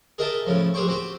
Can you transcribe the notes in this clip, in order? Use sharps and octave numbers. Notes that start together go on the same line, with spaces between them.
G#4 A#4 D#5 E5 G5 A5
A2 C#3 F3
A#1 G4 G#4 C5 G5 C#6
C4 F#4 G4 G5